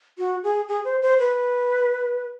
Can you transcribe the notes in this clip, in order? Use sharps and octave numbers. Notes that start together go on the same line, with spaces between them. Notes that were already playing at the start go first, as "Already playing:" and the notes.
F#4
G#4
G#4
C5
C5
B4